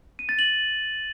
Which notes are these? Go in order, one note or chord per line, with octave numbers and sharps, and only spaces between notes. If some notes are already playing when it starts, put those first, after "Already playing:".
D#7
A6
F#7